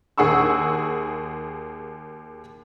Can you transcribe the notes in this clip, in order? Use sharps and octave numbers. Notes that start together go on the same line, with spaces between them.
D#2 G#4 F#5 C#6 E6